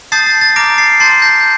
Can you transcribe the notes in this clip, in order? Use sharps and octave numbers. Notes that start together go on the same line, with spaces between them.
A5 D#6 G6 A6 C7
A6
A6
A#5 D6 F6 A#6 D7
A6 C7
A5 C6 G6 A6 C7
G6 A#6